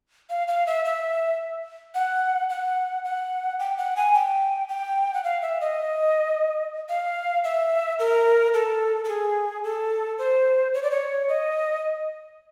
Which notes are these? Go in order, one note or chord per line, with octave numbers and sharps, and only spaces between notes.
F5
F5
E5
E5
F#5
F#5
F#5
G5
F#5
G#5
G5
G5
F#5
F5
E5
D#5
F5
E5
A#4
A4
A4
G#4
A4
C5
C#5
D5
C#5
D#5